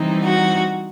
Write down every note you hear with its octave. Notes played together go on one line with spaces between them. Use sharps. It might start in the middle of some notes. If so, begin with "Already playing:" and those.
Already playing: E3 G3 C4 D#4
F#4